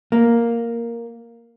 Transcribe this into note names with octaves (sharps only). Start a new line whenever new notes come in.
A#3